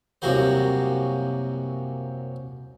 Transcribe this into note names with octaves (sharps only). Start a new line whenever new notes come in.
C2 F#2 C3 A#3 F#4 C5